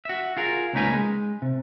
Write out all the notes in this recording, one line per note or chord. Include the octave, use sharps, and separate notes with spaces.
F#4 E5
F4 G#4 A#4
C#2 A#3 C#4 D#4 B4 G#5
G#3
C3